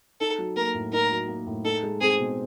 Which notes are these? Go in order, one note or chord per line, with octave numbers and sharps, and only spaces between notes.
D#4 A4
F#3
A#3 A#4
A2
D#4 A#4
F#3
A#3
A2
D#4 A4
G#3
C4 G#4
B2